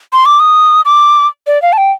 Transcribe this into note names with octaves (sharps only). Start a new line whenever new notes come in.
C6
D6
D#6
D6
D5
F5
A5
G5